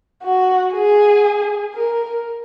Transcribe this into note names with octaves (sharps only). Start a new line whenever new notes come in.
F#4
G#4
A#4